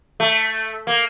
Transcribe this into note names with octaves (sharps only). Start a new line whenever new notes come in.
A3
A#3